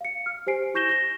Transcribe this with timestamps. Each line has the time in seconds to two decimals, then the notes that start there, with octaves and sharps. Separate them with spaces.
0.01 F5 C#7
0.26 F6
0.47 G4 C5 G#5 C7 D7
0.74 E4 C#6 G6 A#6 E7 G7
0.89 A#6 G7